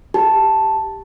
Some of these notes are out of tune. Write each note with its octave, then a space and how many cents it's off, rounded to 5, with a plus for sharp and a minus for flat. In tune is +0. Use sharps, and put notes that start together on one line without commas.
G4 +0 A5 +0